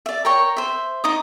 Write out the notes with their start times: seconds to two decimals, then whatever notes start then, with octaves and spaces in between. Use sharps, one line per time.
0.06 D5 E5
0.25 A#4 C#5 G5 C#6
0.57 C5 E5
1.04 D#4 D6 D#6